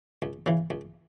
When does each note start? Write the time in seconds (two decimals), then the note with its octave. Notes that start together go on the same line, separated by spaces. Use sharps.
0.22 C#2
0.46 C#3 E3
0.70 C#2